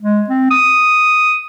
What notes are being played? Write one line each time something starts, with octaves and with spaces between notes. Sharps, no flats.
G#3
C4
D#6